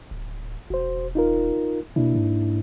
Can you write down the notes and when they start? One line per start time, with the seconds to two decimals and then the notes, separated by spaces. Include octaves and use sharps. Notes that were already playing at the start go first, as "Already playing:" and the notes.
0.11 D1
0.70 E1 F#4 C5
1.15 D#4 F4 A#4
1.96 B2 A#3 D4 E4
2.15 G#2